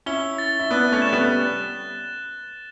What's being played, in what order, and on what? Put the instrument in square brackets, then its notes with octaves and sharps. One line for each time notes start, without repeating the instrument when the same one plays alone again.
[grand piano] C#4 E4 [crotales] G7
[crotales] A6
[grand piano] E4
[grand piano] B3 D4 [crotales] F#6
[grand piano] A3 C#4
[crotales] E7
[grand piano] G3 B3